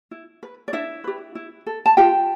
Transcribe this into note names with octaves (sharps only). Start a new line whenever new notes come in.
E4
B4
D5
D4 E4 E5
G4 B4
E4
A4
A5
F4 G4 G5